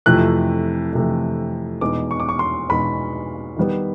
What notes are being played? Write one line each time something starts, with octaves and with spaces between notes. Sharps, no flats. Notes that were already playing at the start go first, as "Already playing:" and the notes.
F2 C3 E3 A3 F#6
F2 C3 E3 A3
E2 B2 G#3 B3 D#4 D6
C#6
D6
C#6
C6
E2 B2 G#3 B3 D#4 B5
D#3 G3 B3